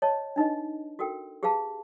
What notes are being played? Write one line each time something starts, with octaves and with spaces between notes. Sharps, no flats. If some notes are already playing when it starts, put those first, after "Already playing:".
C#5 D#5 A5
D4 D#4 B4 D#5
F#4 A4 A#4 G5
G4 G#4 B4 F5 A5